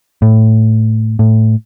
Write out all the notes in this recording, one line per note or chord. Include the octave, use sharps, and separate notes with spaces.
A2
A2